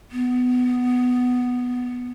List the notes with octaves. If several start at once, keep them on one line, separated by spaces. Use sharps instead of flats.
B3